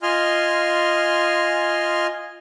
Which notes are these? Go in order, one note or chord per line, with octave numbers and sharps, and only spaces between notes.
F4 D#5 G#5 C6 F6